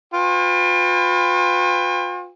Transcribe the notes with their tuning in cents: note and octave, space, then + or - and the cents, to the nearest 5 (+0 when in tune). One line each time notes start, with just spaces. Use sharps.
F4 +40 B4 +30 G5 +40